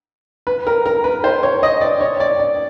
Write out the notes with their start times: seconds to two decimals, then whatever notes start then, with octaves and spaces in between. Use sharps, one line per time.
0.47 B4
0.67 A#4
0.86 A#4
1.04 B4
1.24 C5
1.43 C#5
1.63 D#5
1.81 D5
2.01 C#5
2.20 D5
2.39 D5